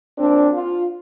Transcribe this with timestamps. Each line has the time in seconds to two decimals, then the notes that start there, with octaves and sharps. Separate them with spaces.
0.18 A#2 C4 D4
0.54 F4